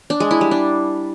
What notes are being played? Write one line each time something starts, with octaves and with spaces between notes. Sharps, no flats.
D4
G#3
E4
G3
D4